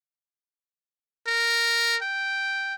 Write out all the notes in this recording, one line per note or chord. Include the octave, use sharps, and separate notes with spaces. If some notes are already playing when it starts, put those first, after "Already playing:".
A#4
G5